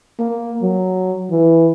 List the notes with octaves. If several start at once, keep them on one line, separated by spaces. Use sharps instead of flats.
A#3
F#3
E3